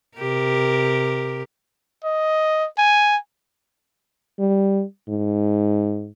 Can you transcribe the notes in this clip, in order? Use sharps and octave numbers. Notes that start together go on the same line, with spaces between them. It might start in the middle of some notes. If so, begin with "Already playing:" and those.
C3 G4 A#4
D#5
G#5
G3
G#2